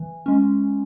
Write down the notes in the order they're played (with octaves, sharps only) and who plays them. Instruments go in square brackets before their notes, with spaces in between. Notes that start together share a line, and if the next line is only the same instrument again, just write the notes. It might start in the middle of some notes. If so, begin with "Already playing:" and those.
Already playing: [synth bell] E3
G#3 C#4